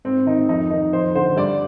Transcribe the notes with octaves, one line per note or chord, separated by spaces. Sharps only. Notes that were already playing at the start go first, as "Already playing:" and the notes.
G#2 C4
D#3 D#4
F2 D#4
D#3 D#4
F2 C5
D3 C5
G2 D5